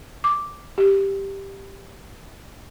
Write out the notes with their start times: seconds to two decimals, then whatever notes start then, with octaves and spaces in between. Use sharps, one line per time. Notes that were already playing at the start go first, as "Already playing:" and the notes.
0.24 D6
0.78 G4